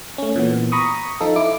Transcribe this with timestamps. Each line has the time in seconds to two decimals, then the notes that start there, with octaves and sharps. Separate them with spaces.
0.18 A3 C#4
0.36 A#2 E3 B3
0.72 A#5 B5 C#6 D#6
1.21 F3 D#4 F4 A4
1.36 E4 D6